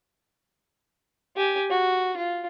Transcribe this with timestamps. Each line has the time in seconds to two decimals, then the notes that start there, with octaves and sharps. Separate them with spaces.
1.36 G4 G#5
1.70 F#4
2.16 F4